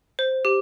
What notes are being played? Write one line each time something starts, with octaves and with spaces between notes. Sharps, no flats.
C5
G4